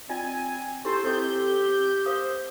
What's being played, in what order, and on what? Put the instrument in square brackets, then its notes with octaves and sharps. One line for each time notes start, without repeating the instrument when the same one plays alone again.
[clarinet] C4 [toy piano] F4 D5 D#5 [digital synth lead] G#5
[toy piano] E4 G4 C#6 [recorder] A4 [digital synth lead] C5
[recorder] C4 [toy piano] E4 A4 D#5 [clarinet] G4 [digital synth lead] G6
[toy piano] A#4 F5 D#6 [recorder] C5